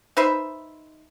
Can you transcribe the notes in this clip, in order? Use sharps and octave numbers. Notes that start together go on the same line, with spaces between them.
D#4 B4 C5 E5